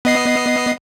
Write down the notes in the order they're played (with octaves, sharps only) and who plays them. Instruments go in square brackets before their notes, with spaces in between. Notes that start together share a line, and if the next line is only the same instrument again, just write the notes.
[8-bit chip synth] B3 D#5 C7